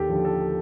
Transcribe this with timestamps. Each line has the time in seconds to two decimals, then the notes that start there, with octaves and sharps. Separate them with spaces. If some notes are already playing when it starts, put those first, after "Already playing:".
Already playing: D#2 G4 A4
0.09 D3 F3
0.25 A4